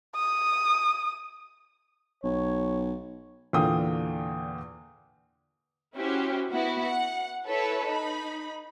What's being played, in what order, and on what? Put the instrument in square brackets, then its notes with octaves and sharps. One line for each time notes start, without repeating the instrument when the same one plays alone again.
[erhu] D#6
[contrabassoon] B1 [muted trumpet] C#5
[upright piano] E2 A#2 D3 F5 G5 D#6
[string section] C#4 E4 F#4 G4 C5
B3 E4 F#4
F#5
E4 A4 B4 C#5
D#4 B5